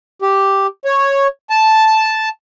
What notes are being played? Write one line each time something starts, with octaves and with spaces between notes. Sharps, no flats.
G4
C#5
A5